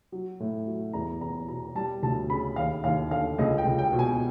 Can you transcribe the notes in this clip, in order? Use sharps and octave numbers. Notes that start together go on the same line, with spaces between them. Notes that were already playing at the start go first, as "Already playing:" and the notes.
F#3
A2
F#3
E2 A#5
E2 A#5
B2 A#5
G3 A5
D2 A5
C#3 B5
D#2 F5
D#2 F5
D3 F5
C#2 D#5
G5
C#2
G5
B2
G#5